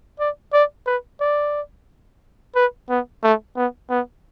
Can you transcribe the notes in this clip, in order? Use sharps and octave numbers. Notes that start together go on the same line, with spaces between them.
D5
D5
B4
D5
B4
B3
A3
B3
B3